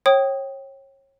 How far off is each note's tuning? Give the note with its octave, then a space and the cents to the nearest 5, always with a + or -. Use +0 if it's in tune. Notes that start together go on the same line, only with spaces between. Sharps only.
C#5 -30 G5 -15 D#6 +0